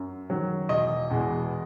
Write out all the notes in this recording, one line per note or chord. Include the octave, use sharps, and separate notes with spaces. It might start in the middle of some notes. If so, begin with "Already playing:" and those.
Already playing: F#2
D#3 F#3
E1 D#5
E2 B2 G#3 B3